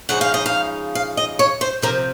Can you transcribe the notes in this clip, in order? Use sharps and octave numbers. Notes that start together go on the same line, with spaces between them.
C#3 F3 G#3 D#4 F#5
F5
D#5
F5
F5
D#5
C#5
C5
C3 F3 C4 A#4